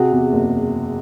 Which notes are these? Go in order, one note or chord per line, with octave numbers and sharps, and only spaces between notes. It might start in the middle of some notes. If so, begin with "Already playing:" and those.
Already playing: C3 F#4 G#4
E2
F#1